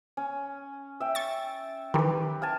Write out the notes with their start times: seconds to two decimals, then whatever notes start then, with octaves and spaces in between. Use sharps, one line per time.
0.17 C#4
1.00 E5 G5
1.15 C#6 A6
1.94 D#3 E3 G4 B4
2.42 F5 G#5 A5